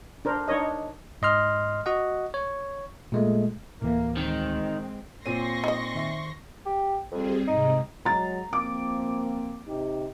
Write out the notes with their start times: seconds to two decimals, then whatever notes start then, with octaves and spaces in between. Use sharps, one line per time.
0.25 D4 A#4 C5
0.48 D4 D#4 A#4 C#5 D#5
1.22 G#2 D#5 C6 F6
1.86 F#4 D#5 F#5
2.34 C#5
3.12 A#2 G#3 A3
3.82 D2 A2 E3 A#3
4.17 D#3 G#3 C4
5.26 A#2 C4 C#5 C6 C#6 A#6 D#7
5.64 D#4 D#5
5.95 D#3 C5 E5
6.66 G4
7.12 F2 G3 C4 G#4
7.47 G#2 C3 D#4
8.05 F#3 G#3 A#5 A6
8.53 F3 A#3 C4 D6
9.68 C3 D#4 G4